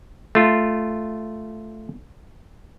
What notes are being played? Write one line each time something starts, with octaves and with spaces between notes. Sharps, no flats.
A3 F4